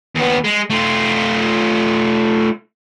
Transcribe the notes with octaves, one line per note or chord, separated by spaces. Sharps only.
D#2 B3
G#3
A3 F4